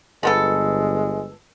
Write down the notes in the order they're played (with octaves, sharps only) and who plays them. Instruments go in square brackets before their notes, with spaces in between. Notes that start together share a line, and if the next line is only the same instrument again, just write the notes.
[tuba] G1 [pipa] F3 B3 A4 [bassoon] G#3